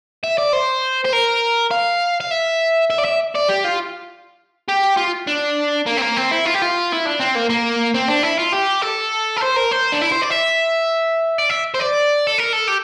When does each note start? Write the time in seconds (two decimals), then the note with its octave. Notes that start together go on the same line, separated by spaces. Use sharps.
0.24 E5
0.38 D5
0.53 C5
1.05 C5
1.13 A#4
1.71 F5
2.21 F5
2.31 E5
2.90 E5
2.98 D5
3.05 E5
3.35 D5
3.49 G4
3.64 F4
4.68 G4
4.97 F4
5.27 D4
5.86 A#3
5.97 C4
6.02 A#3
6.17 C4
6.31 E4
6.45 F4
6.54 G4
6.62 F4
6.92 E4
7.05 D4
7.19 C4
7.35 A#3
7.50 A#3
7.94 C4
8.08 D4
8.23 E4
8.39 F4
8.53 G4
8.82 A4
9.37 A#4
9.42 C5
9.56 A#4
9.71 C5
9.92 D4
10.01 E4
10.12 C5
10.22 D5
10.30 E5
11.38 D5
11.50 E5
11.74 C5
11.80 D5
12.27 A4
12.38 A#4
12.53 A4
12.67 G4